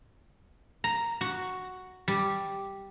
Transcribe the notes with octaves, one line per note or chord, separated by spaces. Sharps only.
A#5
F#4
G3